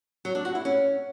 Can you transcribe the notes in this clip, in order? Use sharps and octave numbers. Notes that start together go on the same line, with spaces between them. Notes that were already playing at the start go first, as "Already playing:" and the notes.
F#3
D4
F#4
E4
C#4